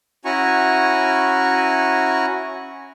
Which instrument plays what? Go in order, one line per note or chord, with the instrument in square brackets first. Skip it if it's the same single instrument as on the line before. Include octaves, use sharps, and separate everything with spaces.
[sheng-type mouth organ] C#4 E4 F#4 G#5 A#5 C#6